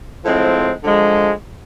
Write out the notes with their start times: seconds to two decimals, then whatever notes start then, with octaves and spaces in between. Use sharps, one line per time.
0.25 A2 F3 G#3 C4
0.84 D3 F3 G#3